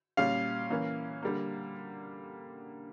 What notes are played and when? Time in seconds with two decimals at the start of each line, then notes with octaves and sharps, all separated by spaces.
0.17 A#2 G3 C#4 F5
0.70 E3 A#3 C#4
1.22 D3 G3 A#3